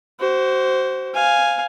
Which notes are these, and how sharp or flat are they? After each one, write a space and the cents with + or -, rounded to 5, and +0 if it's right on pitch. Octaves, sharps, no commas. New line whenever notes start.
F#4 +35 C5 +0
F5 +0 G#5 +0